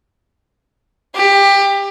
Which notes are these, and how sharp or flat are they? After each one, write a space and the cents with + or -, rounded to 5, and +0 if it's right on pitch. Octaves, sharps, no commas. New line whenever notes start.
G4 +20